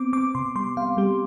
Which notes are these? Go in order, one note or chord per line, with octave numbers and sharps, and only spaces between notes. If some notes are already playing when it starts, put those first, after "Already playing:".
Already playing: B3 C4 D6
C4 D6
C3 C6
G3 C6
G3 F5
G3 G4